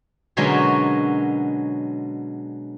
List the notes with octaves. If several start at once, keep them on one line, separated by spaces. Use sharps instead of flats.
B2 D3 F#3 G#3 C#4 A#4